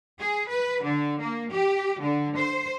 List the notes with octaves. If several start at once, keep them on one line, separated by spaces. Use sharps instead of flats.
G#4
B4
D3
A#3
G4
D3
C5